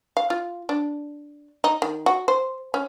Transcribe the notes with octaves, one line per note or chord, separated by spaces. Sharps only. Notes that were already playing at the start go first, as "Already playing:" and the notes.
F5
F4
D4
D#4
D#3
F#4
C5
C#4